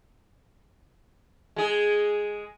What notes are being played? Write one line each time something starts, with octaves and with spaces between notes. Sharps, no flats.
G#3 G#4